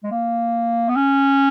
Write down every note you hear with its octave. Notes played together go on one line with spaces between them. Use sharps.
G#3
A#3
B3
C#4